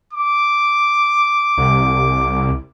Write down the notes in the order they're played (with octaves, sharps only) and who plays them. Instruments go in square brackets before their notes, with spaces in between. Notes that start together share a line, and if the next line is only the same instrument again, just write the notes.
[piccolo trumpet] D6
[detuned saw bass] C2